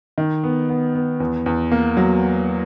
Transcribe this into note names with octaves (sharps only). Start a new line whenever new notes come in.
D#3
B3
B3
B3
E2
E2
A#3
F#3